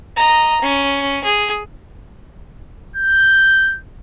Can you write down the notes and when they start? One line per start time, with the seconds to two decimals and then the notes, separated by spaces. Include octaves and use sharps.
0.17 D#5 A#5
0.62 C#4
1.24 G#4
2.96 G6